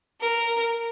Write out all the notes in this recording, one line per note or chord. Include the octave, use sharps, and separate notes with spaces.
A#4